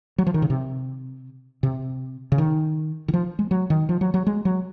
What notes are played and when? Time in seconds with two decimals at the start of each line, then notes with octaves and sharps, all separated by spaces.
0.18 F#3
0.27 F3
0.34 D#3
0.42 C#3
0.50 C3
1.63 C3
2.32 C#3
2.38 D#3
3.08 D#3
3.13 F3
3.39 G#3
3.51 F#3
3.70 D#3
3.89 F3
4.01 F#3
4.14 F#3
4.26 G#3
4.45 F#3